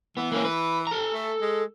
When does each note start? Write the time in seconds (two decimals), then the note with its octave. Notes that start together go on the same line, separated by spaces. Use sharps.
0.17 E3 B3
0.32 A#3 C#4
0.45 B4
0.87 A4 A#5
1.14 A3
1.42 G#3